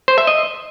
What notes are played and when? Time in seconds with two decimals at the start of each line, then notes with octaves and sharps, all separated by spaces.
0.08 C5
0.18 E5
0.27 D#5